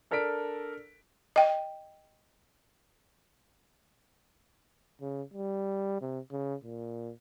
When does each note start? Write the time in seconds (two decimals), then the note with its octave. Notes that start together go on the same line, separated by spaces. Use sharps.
0.11 D4 A4 A#4 D5 B6 D7
1.36 D#5 G5
5.01 C#3
5.34 G3
6.01 C3
6.32 C#3
6.64 A#2